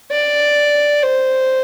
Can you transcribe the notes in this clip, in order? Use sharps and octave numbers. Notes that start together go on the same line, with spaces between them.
D5
C5